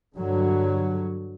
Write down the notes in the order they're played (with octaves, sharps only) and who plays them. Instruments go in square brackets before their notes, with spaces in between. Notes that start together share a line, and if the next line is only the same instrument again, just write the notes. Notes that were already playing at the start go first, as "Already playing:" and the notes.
[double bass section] G2 D3 F#3